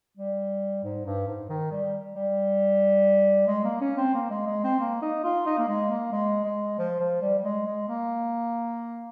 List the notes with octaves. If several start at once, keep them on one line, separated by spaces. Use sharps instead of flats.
G3
G#2
G2
G#2
D#3
G3
G3
G#3
A#3
C#4
C4
A#3
G#3
G#3
C4
A#3
D#4
F4
D#4
A#3
G#3
A#3
G#3
G#3
F3
F3
G3
G3
G#3
G#3
A#3